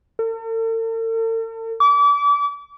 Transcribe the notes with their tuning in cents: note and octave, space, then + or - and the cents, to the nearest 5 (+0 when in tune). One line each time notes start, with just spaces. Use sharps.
A4 +45
D6 -35